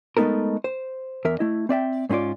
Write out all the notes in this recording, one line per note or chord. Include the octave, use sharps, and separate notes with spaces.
G#3 A3 B3 D#4 A4 A#4
C5
E2 A#4 E5
A3 E4 D#5
C4 D5 E5 G5
G#2 C4 C#4 F4 D5